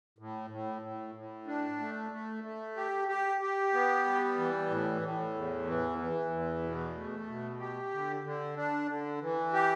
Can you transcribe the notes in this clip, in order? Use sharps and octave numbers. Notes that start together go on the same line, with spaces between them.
A2
A2
A2
A2
D4
A3
A3
A3
G4
G4
G4
B3
G3
E3
A2
A2
E2
E3
E3
E2
B2
A3
B2
G4
D3
D3
D4
D3
E3
G4